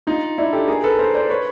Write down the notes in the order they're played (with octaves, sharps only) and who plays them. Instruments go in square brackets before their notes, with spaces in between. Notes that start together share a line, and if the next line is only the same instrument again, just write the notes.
[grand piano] D#4 F4
D4 E4
G4 A4
G#4 A#4
A4 B4
A#4 C5
C5 D5
B4 C#5